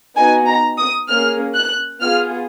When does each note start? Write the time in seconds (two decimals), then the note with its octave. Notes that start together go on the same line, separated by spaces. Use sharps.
0.16 B3 D#4 F#4 G#5
0.47 A#5
0.78 D#6
1.08 A#3 C#4 G#4 F6
1.56 F#6
2.01 B3 F4 G#4 F6